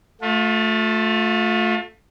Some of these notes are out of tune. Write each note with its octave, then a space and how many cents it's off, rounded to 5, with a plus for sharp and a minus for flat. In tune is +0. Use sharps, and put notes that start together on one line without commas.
A3 +0 F4 +35